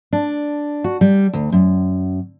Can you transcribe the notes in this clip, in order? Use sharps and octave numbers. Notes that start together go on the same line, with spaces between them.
D4
F#4
G3
D2
F#2